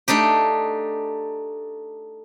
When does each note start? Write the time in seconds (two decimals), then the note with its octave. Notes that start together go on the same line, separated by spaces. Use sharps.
0.08 A3 D4 D#4 G4